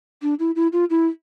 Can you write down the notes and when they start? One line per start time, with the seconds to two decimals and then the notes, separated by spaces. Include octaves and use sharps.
0.22 D4
0.39 E4
0.56 E4
0.73 F4
0.90 E4